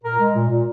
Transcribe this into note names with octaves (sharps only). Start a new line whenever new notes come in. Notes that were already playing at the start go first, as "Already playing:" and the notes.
A#2 A#4
G#3
A#2
A#2